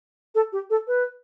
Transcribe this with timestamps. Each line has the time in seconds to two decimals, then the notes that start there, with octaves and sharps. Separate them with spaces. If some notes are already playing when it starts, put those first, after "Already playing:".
0.35 A4
0.53 G4
0.70 A4
0.87 B4